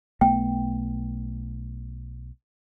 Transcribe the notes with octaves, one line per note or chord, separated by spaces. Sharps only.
B1 A3 B3 G5